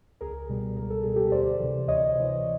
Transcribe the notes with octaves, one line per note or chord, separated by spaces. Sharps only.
C#2 G#4 A#4
B2 G3
C#2 A#4
A4
B2 G3 G#4
G4 A4
D2 C5 D5
C3 E3
D2 C#5 D#5
C3 E3